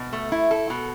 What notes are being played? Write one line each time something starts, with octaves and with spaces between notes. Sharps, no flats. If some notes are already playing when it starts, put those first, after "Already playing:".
Already playing: B2
A3
E4
A4
B2